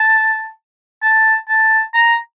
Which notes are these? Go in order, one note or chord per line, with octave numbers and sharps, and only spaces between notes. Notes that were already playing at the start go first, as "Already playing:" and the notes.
Already playing: A5
A5
A5
A#5